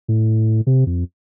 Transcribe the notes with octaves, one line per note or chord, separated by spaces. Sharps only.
A2
C3
F2